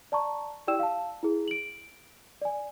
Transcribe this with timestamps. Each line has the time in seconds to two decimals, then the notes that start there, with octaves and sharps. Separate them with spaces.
0.12 D5 A5 A#5 C#6
0.67 E4 G4 D5 G5 E6 E7
0.79 F5 A5
1.23 E4 G#4
1.48 D7 F#7
2.42 D5 G#5